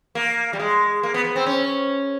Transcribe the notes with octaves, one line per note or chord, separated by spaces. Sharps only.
A#3
G3
G#3
A#3
B3
B3
C4
C#4